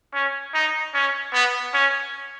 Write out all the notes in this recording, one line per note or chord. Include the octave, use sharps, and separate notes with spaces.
C#4
D#4
C#4
B3
C#4